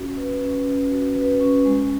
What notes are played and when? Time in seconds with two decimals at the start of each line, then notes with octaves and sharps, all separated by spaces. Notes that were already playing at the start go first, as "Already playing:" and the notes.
Already playing: C#4 F#4
0.16 B4
0.41 C#4
0.66 C#4
0.91 F#4
1.16 B4
1.40 C#4
1.65 G#3